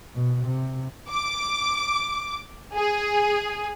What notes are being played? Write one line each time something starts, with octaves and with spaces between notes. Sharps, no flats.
B2
C3
D6
G#4